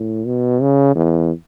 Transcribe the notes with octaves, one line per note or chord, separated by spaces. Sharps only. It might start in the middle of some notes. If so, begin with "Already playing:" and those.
Already playing: A2
B2
C#3
E2